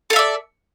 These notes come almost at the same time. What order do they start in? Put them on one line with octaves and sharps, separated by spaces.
A4 F5 E5 D5